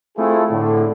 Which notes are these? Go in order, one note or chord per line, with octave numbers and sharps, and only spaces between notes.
A3 C4 E4 F4 G#4 A4
A2 D3